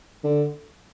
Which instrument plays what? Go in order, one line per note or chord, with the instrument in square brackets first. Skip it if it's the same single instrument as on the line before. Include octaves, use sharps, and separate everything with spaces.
[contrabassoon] D3